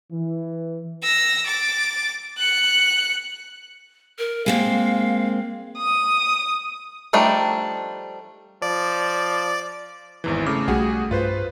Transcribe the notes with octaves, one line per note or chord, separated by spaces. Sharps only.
E3
E6 A#6
D6 A6
F#6 C#7
A#4
G#3 A#3 C4 F5
D#6
F3 G3 A3 D4 D#4
F3 D5
G#1 E2 E3
C#3 A3 D6
B1 G3 A3 F#4 G#4
G2 F4 B4 C5